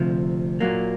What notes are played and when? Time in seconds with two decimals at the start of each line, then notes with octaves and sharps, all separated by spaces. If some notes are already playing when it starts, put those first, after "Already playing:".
Already playing: D2 C3 F3
0.60 A#2 F#3 A#3